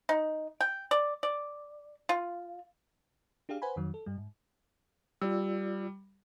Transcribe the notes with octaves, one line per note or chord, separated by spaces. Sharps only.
D#4
G5
D5
D5
F4
D4 G4 G#4 F5
B4 C5 F#5 G#5 B5
F2 D#3 F#3
A4
G2 G3
G#2
G3 F4 D5 E6